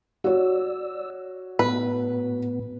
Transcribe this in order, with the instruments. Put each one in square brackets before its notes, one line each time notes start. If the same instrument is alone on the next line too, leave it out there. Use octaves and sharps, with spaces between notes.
[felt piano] F#4 C#5 [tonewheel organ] D5 E6
[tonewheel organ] A2 B3 [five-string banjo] B4